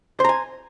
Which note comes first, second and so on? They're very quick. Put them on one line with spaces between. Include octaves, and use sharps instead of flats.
C5 A#5 G#5